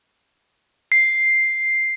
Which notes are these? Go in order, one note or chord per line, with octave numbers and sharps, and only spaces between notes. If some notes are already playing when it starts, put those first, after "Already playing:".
C7